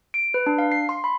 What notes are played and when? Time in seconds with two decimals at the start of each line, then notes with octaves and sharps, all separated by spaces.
0.14 D7
0.34 B4
0.46 D4
0.58 F5
0.72 C7
0.89 C6
1.04 B5